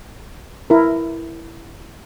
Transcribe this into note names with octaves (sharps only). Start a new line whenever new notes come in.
E4 A#4